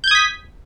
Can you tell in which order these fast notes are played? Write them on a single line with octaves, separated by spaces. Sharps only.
G6 G#6 D#6 B6